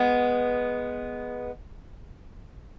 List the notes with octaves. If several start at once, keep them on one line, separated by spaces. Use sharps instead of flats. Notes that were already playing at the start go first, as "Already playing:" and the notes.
Already playing: G#3 B3